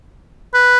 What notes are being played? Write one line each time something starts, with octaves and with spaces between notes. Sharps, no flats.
B4